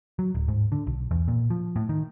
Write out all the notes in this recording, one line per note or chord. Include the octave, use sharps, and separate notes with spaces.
F#3
D1
G#2
D3
B1
E2
A#2
F3
A2
D#3